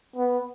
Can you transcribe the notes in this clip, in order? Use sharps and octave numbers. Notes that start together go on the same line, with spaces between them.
B3